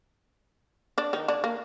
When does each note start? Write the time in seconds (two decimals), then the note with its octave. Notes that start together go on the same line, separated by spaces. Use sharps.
0.98 D4 D5
1.13 D#3 D#4
1.28 D3 D4
1.44 A#3